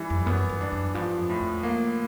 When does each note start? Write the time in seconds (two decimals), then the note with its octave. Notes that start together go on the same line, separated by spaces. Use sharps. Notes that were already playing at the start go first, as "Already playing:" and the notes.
Already playing: E3 G3
0.10 F2
0.26 F#2 B3
0.49 F#2
0.61 D4
0.72 F#2
0.94 G2 F3
1.18 F2
1.30 A2
1.40 E2
1.63 A#3